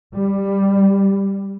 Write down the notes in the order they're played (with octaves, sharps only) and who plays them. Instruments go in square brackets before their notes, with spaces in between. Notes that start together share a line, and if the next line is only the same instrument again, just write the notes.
[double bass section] G3